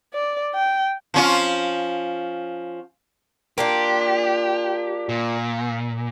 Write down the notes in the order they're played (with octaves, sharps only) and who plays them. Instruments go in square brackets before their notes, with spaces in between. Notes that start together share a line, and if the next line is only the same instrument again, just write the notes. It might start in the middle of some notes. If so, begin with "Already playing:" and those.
[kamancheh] D5
G5
[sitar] F3 C#4 F4
[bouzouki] A#3 D4 F4 [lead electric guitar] G4
[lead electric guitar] A#2